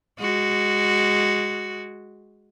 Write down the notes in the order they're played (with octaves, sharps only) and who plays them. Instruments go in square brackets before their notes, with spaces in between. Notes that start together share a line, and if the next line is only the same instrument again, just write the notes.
[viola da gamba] G#3 F#4